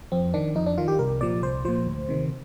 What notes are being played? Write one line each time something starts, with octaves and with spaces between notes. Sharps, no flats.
F2 C4
D#3 D4
F2 D#4
D4
D#3 F4
G4
C2 A#4
A#2 F3 D5
C2 C5
A#2 F3 C5
D2
C3 D#3